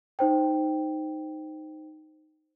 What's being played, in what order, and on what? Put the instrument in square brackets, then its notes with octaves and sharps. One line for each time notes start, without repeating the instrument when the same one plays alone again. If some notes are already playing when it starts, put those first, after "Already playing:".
[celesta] D#4 C5 G5